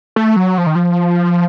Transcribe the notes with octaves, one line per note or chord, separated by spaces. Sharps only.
A3
F#3
F3
D#3
F3